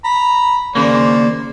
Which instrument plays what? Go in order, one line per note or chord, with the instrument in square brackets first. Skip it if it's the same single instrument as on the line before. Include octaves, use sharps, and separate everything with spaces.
[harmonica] A#5 B5
[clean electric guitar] D#2 C#3 A#3 [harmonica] C5 D5